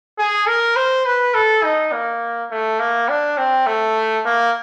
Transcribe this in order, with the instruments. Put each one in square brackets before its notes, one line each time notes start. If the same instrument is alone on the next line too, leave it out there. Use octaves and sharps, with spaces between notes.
[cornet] G#4
A#4
C5
B4
A4
D#4
A#3
A3
A#3
D4
C4
A3
A#3